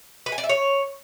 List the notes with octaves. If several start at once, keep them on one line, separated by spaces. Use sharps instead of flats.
B4
G#5
D5
E5
C#5